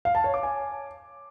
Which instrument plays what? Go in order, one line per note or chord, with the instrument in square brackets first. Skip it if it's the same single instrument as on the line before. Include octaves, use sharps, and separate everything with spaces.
[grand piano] F5
A5
C#5
D6
G#5